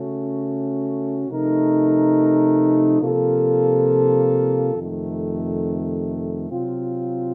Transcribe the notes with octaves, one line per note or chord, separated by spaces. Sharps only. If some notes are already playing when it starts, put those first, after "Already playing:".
Already playing: C#3 A3 C#4 F#4
C3 F3 A3 D#4 A#4
C3 F3 A#3 F4 A4
F2 C3 D#3 A3
C3 F#3 C4 F4